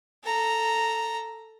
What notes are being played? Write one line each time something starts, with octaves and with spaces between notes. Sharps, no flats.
A4 A#5